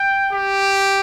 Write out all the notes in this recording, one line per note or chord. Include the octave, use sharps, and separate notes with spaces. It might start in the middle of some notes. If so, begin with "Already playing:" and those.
Already playing: G5
G4